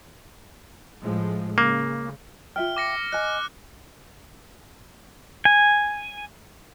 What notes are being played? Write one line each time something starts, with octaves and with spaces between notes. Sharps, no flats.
A2 F3 G#3
C#3 G#3 A#3
F4 E5 G5 F6
D6 A#6 C#7
D#5 G#5 F#6
G#5